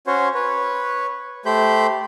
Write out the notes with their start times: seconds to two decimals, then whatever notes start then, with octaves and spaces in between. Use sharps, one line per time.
0.07 C#4 F#4 C5 C#5
0.34 B4 C#5
1.46 A3 G4 C5 B5 G6